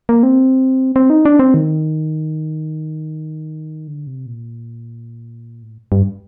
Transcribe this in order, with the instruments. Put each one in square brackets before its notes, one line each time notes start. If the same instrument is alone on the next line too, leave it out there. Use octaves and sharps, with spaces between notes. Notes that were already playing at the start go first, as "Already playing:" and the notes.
[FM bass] A#3
C4
C4
D#4
D4
C4
D#3
D3
C3
A#2
A2
G2